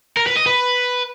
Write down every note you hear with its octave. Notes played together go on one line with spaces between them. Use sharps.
A#4
B4
D#5
B4